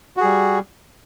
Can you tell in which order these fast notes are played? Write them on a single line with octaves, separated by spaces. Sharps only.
F#4 G#4 G3